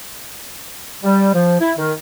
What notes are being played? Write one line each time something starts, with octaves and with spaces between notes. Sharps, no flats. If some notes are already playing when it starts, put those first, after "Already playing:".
G3
F3
E4
D#3